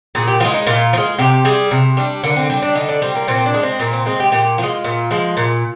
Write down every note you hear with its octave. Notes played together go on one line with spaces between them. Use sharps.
A#2 G#4
G4
F3 G#3 F4
D#4
A#2 F4
F3
G#3
C3 G4
G3 G#4
C3
G3 D4
D3 A#3
C4
G3 D4
D4
D3 D#4
D4
G3 C4
A#3
A#2 C4
D4
G#3
C4
A#2 A#3
C4
G#3 C4
G4
A#2 G4
F3 G#3 F4
A#2
F3 G#3
A#2